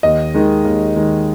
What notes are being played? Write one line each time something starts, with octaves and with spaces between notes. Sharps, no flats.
D#2 D#5
D#3 G#3
D#2
D#3 G#3